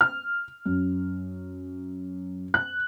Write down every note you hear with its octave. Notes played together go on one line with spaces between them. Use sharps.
F6
F#2
F#6